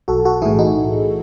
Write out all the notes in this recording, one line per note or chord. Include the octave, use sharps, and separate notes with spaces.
B1 F#4 A4
F#4 A4
A2 E3 E4 G#4
D#4 F#4